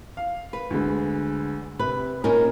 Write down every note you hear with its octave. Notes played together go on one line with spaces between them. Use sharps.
F5
B4
D2 D3 G#3
C3 B4
A#2 C#4 D#4 A#4